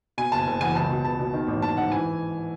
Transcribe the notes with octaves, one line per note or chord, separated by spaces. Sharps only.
B2 G#5
F#1 A5
F#1
E2 G#5
C#2 A5
B2
C#2 A5
B2
D#3
A1
A1 A5
G#2 F#5
E3 G#5